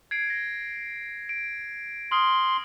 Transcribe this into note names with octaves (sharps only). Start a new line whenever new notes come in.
G#6 C7 D7
A#6
D7
C6 D#6 F6 F#7